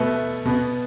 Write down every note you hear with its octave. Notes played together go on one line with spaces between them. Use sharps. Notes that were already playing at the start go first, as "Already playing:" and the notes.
Already playing: B2 A3 B4
B2 B3